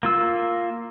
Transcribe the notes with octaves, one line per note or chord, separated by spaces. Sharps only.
A#3 F4 E6